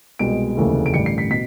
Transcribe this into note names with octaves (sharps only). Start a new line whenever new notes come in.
C2 B2 G#3 D7
F1 D#2 C#3 E3 A3
D7
A1 G2 D3 G3 C#7
C7
B6
B2 B6